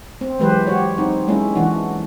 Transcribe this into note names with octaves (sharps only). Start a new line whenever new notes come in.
C4
E3 F#3 G#3 G4 B4 C5
F#4 G4 C#5
C4 D#4
G#3 A#3 C#4 E4
E3 D4 F#4